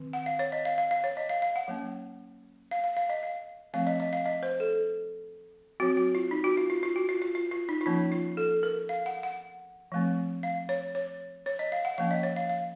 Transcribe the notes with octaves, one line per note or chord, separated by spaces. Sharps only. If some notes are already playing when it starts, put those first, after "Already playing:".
Already playing: D#3 C4
F#5
F5
C#5
D#5
F5
F5
F5
C#5
D#5
F5
F5
F#5
F#3 A#3 C#4
F5
F5
F5
D#5
F5
F3 A3 C4 F5
D#5
D#5
F5
D#5
C5
A4
F#3 C4 F#4
F#4
F4
D#4
F#4
F4
F4
F4
F#4
F4
F4
F4
F4
D#4
F4
F3 A#3 C#4 D#4
F4
A4
A#4
F5
F#5
F#5
F3 A3 C4
F5
C#5
C#5
C#5
D#5
F5
F#5
F3 A#3 C#4 F5
D#5
C#5
F5
F5